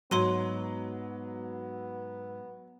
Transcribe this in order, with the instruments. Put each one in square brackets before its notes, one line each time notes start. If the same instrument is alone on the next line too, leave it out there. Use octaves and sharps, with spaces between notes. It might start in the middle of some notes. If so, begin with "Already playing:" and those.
[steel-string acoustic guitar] G#2 B2 [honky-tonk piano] F#3 [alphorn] B3 [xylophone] C#5 C6 D#7